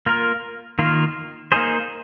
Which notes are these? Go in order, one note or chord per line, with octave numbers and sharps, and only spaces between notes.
A#3 F4 A#4
D#3 A#3 F4
A#3 D#4 G#4 C5